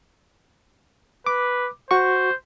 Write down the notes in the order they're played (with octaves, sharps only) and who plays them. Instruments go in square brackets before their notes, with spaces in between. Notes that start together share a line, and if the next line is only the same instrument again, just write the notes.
[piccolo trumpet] B4 [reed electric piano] D6
[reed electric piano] F#4 C#6 [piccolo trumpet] C5